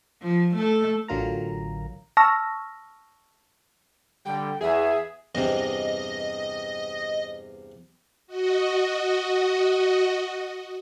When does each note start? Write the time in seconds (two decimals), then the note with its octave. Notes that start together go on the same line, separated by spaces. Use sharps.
0.22 F3
0.55 A3 A4
1.08 A1 D3 F#3 F4 A#4 A#5
2.17 A5 C#6 E6 F6 A#6
4.25 D3 G3 G5
4.61 E2 G#4 E5
5.35 E2 G2 C3 D#5
8.27 F#4 D#5